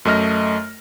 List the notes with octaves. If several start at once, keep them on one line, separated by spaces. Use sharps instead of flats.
F#2 A3 D#5 F6 A#6